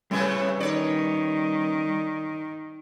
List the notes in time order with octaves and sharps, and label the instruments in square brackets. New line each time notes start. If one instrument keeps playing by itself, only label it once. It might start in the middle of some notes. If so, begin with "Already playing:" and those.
[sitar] A2 C3 A3 [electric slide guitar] G3 C#4 B4
[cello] D#3 [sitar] C#5 D5